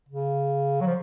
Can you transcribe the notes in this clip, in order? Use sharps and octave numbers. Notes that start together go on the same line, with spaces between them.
C#3
F#3
F3